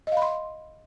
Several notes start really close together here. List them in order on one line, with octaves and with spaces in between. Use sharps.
D#5 F5 B5 C6